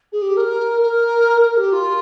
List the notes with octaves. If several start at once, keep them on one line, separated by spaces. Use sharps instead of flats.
G#4
G4
A#4
A#4
A#4
G4
F4